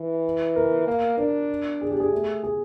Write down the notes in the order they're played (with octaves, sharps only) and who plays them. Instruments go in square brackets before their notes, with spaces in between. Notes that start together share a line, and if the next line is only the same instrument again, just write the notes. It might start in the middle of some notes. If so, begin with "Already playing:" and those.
Already playing: [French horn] E3
[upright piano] A#4
[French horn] A#3
[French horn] D4 [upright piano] A#4
[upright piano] G#4
G4
G#4
[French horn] A3
[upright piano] G#4